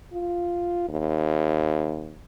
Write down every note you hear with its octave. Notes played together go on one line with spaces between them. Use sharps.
F4
D#2